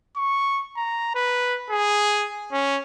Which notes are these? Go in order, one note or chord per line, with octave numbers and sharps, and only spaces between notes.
C#6
A#5
B4
G#4
C#4